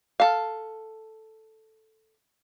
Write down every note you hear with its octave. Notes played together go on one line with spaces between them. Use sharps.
A4 F5